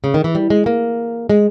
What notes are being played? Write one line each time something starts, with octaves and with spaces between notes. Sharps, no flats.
C#3
D#3
E3
G3
G#3
A#3
G#3